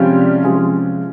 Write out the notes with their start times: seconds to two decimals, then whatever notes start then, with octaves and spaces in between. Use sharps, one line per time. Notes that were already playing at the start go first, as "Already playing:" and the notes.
Already playing: C3 F3 G3 G#3 C#4 F4 G4
0.44 C3 F3 G#3 C#4 F4 G#4